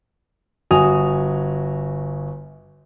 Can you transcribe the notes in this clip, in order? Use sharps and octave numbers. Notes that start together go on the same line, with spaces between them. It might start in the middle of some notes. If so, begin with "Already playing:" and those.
G1 F#4 G#5 D#6 F7